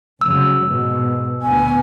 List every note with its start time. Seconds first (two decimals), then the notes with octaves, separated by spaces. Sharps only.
0.21 F1 C#3 F#3 E6
0.62 G#2 B2
1.42 D2 A#2 B3 G#5